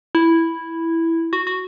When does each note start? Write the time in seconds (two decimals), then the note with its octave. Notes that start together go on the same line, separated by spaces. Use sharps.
0.15 E4
1.33 F#4
1.47 F#4